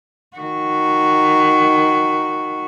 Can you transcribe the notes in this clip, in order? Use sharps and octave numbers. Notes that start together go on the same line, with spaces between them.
D#3 F#4